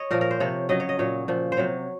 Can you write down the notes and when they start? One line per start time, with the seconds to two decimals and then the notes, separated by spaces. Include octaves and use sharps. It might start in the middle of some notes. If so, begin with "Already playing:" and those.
Already playing: C#5 D#5
0.11 A#2 F3 A#4
0.21 A#4
0.31 C5
0.40 C3 F3 C#5
0.69 C#3 F#3 D#5
0.80 C#5
0.89 D#5
0.99 A#2 F#3 C#5
1.28 A#2 F3
1.52 C5
1.57 C3 F#3 C#5